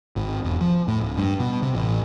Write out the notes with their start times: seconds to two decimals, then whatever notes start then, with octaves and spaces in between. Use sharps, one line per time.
0.16 G#1
0.45 E1
0.61 F3
0.88 A2
1.01 D1
1.18 G2
1.40 B2
1.62 C3
1.75 A1